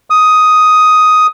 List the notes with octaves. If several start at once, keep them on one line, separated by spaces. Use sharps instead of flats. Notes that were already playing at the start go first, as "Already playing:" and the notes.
D#6